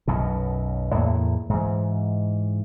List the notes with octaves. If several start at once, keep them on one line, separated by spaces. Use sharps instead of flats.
B1 F#2 B2
E2 A2 A#3
G#2 E3